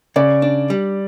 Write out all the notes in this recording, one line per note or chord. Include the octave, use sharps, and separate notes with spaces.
C#3 D5
D4
G3